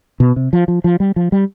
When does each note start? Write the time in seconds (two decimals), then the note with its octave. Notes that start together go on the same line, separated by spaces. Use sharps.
0.20 B2
0.36 C3
0.53 F3
0.68 F3
0.84 F3
1.00 G3
1.16 F3
1.32 G3